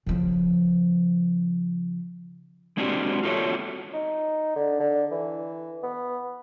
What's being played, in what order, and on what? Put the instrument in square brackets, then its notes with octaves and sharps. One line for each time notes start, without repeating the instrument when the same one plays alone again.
[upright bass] C#3 F3
[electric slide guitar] G#3 C4 D4 E4 F#4 G4
F4 F#4 A4 A#4 C#5 E5
[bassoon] D#4
D3
D3
E3
B3